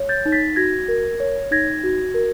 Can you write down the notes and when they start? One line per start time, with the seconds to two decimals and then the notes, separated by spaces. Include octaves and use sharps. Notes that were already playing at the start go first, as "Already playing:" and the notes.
Already playing: C#5
0.09 G6 A6
0.26 D#4
0.32 A6 B6
0.56 F#4 G#6 A#6
0.88 A#4
1.20 C#5
1.51 D#4 G#6 A#6
1.84 F#4
2.14 A#4